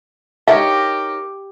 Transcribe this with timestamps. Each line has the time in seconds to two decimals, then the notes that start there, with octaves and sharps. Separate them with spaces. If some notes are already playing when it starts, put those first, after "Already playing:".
0.48 D#4 G4 A#4 C#5 F5